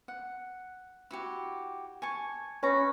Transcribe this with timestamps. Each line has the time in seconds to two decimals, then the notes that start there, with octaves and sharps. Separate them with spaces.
0.08 F#5
1.11 E4 F#4 G4
2.02 G#5 A5 C#6
2.63 C#4 B4 A#5